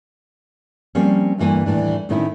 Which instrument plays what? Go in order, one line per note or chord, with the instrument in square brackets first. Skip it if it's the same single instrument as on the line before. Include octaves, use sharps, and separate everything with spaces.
[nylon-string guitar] F3 G3 A#3 C4 C#4
D2 G2 E3 A#3 G#5
D#2 A2 E3 D4
A2 D#3 C4 C#4 E4